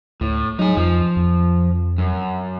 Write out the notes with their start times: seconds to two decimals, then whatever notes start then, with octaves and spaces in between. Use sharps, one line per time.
0.21 D2 A2
0.59 F#3 D#4 G#4
0.77 F2 F3
1.17 F2
1.98 F#2